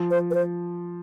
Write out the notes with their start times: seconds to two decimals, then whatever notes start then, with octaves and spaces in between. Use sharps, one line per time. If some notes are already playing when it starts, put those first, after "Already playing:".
Already playing: F3
0.10 C5
0.31 B4
0.34 C5